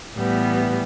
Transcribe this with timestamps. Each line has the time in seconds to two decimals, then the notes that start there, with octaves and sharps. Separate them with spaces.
0.15 A2 E3 G3 B3